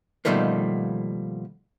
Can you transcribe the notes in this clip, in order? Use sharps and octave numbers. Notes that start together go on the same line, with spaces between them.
B2 D#3 F3 G3 A3 A#3